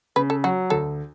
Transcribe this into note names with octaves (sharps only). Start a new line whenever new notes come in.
C#3 B4
A4
F#3 F#4
D2 A4